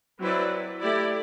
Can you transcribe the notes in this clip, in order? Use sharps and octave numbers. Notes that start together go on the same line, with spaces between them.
F#3 C4 E4 B4 D5
A3 E4 G4 D5